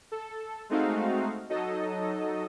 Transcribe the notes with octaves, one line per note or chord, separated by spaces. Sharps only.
A4
G#3 A3 C4 D#4 F#4 F5
F#3 D#4 A4 D#5